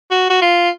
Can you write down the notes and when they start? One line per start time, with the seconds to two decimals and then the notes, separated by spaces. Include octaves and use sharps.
0.11 F#4
0.30 F#4
0.42 F4